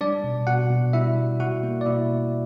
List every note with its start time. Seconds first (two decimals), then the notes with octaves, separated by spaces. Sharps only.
0.01 G3 D4 D5
0.24 B2
0.47 B2 F#4 F#5
0.70 B2
0.93 G3 E4 E5
1.16 B2
1.40 B2 F#4 F#5
1.63 A#3
1.81 D5
1.86 B2 E4 E5
2.09 A#3